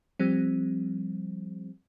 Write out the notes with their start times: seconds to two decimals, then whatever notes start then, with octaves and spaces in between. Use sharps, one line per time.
0.19 F3 G3 C4